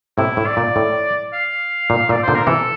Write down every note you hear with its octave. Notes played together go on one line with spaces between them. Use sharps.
A2 C3 E4
A2
D5
A#2
A2
F5
A#2
A#2 D5
C5
A#2 D3
A#4
C3 E3 A4